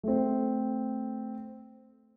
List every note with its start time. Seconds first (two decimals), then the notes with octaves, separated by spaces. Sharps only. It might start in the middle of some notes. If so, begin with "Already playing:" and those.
0.03 A3 C4